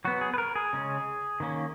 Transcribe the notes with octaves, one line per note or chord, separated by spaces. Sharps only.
F#3 B3 F#4
G#4
B4
A#4
G#4
C#3 G#3 C#4
D#3 A#3 C#4